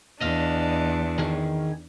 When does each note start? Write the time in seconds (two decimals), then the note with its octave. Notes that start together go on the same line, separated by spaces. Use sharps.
0.21 E2 D4 D#5 F5
1.18 D#3 G#4